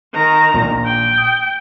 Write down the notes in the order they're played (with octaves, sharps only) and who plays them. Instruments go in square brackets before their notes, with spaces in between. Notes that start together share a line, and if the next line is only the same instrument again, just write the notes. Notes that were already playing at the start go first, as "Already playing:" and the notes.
[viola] D#3 A#5
[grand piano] A#1 A#2
[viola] G5
[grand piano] D#6